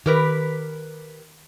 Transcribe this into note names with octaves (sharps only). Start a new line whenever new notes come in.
D#3 G4 A#4 B4